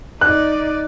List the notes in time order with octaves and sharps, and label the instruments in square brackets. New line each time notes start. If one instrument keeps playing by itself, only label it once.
[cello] D#4 D5 [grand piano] F#6